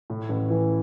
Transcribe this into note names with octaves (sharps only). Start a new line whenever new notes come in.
A2
A1
E3